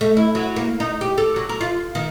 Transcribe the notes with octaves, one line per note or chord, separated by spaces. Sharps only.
A3
E4
F#3
A#3
D#4
G4
A4
F#3
A#4
F4
D#3